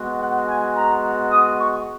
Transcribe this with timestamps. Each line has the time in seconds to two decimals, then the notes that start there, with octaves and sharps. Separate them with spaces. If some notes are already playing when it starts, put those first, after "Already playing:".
Already playing: G#3 B3 F#4
0.19 F#5
0.47 G#5
0.74 A#5
1.31 D#6
1.59 C#6